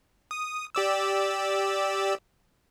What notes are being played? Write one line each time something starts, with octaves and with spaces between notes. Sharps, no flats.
D#6
G4 D5 E6